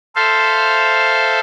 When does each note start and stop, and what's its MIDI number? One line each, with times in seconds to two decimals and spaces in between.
0.16 1.40 69
0.16 1.40 72
0.16 1.40 76
0.16 1.40 77